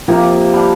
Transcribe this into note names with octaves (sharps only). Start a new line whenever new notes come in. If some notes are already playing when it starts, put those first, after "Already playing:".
C3 F3 A#3 G4
G3 D4 G4